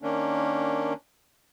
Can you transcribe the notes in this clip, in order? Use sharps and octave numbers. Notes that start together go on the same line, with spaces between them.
D#3 A#3 C#4 D4